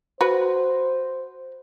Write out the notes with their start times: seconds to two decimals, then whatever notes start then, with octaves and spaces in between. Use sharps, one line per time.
0.21 F#4 B4 C5